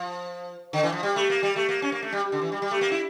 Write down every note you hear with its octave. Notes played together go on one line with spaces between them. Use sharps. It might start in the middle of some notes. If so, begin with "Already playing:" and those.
Already playing: F3
D3
E3
F3
G3
A3
A#3
G3
A3
A#3
C#4
A#3
A3
G3
D3
E3
G3
G3
A3
A#3
E4